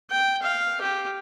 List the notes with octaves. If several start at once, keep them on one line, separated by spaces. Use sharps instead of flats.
G5
F5
G4